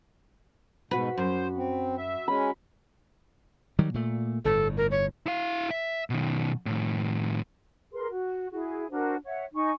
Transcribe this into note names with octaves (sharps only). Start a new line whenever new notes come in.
G#2 B2 F#4 B4 B5
F#2 C5
C4
E5
G#3 C#4 B5
D#3 F#3 G3
A#2 A3
G1 A2 A4
A#4
C#5
E4 F5
E5
B2 D#3
A2 D#3
G#4 A#4 B4 C6
F#4
E4 F#4 G#4
D4 F#4 A#4 C5
C#5 E5 F#5
D#4 G#5 C#6